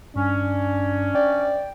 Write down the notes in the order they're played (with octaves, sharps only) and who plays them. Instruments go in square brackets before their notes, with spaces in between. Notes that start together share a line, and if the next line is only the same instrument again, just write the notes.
[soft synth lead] G2 [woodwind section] C#4 [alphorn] D4
[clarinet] D5 [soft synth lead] G5